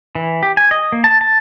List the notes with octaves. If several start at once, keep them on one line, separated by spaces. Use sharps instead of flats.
E3
G4
G#5
D#5
A#3
A5
A5